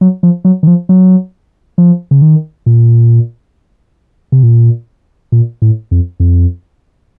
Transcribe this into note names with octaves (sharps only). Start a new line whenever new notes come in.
F#3
F3
F#3
D#3
F3
F#3
F3
C#3
D#3
A#2
C3
A#2
A#2
A2
F2
F2